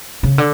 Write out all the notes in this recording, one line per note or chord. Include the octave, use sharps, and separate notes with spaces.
C#3
D3